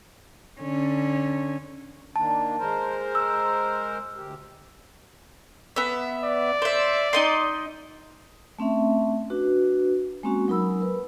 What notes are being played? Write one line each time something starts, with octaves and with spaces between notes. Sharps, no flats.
D3 C#4
D#3 A#3 D4 A5
G#3 A#4 C5
E6
D2 G4
B3 E5
D5
C5 E5
D#4 D#5 C6
A3 C4 C#4 E5
D4 F#4 B4
G#3 A#3 C4 C#4 F#4
F#3 D#4 A#4 B5 E6
A#4 B4